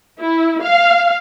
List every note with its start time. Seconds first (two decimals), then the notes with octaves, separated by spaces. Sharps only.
0.20 E4
0.63 F5